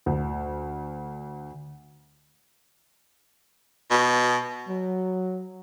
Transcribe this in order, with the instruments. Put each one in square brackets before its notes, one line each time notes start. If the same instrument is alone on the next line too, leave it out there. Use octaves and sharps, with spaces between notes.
[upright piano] D2
[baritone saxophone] B2
[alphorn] F#3